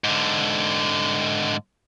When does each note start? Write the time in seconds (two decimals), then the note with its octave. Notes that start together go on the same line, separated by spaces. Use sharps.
0.04 G#2 D3